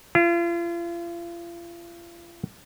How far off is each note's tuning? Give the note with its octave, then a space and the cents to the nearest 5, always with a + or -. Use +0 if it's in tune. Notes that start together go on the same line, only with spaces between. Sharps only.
F4 -40